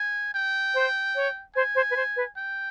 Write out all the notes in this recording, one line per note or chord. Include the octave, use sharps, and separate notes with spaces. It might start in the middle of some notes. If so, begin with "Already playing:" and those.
Already playing: G#5
G5
C5
C#5
C5 G#5
C5
B4
C5
B4
G5